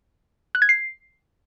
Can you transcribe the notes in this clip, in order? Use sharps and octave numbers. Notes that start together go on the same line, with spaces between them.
F#6
G#6
C7